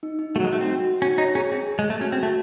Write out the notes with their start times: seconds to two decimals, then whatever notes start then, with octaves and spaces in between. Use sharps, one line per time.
0.03 D#4
0.19 D#4
0.35 A3 F#4
0.40 F#3
0.44 G#3
0.52 A3 D#4
0.61 C4
0.68 F#4
0.85 F#4
1.02 C#4 F#4
1.18 D#4 C#5
1.35 C#4 G#4
1.51 C4 G#4
1.67 G#4
1.79 G#3
1.84 G#4
1.90 A3
2.00 C#4 F#4
2.12 C4
2.17 F#4
2.23 A3